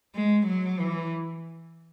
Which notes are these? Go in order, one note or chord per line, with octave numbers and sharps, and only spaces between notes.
G#3
F#3
E3